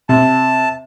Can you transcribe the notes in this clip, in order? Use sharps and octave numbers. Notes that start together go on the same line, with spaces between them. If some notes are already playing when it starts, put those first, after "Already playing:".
C3 A5